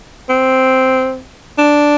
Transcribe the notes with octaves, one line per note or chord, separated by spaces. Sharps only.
C4
D4